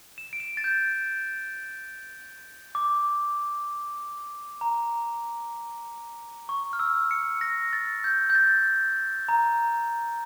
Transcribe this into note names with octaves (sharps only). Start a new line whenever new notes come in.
E7
D7
E7
A6
G6
D6
A#5
C#6
F6
E6
C#7
A#6
A6
G6
G6
A6
A#5